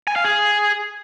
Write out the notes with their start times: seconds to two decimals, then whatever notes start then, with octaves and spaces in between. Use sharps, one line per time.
0.07 G#5
0.16 F5
0.24 G#4